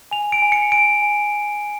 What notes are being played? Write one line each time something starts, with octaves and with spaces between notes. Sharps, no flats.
G#5 F7
D7
G#5
C#7
G#5 D7
G#5